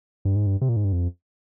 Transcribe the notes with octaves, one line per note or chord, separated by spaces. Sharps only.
G2
G#2
G2
C3
A#2
G#2
G2
F2